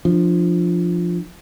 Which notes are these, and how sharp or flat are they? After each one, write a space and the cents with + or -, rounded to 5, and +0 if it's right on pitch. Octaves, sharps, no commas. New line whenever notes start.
F3 +0 D4 +25